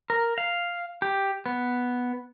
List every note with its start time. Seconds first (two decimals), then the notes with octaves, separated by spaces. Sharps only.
0.10 A#4
0.38 F5
1.02 G4
1.46 B3